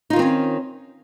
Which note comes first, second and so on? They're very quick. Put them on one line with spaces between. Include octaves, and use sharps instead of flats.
D#4 F4 D#3 C4 C#4